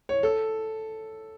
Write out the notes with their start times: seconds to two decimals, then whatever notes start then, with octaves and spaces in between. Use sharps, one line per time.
0.09 C#5
0.23 A4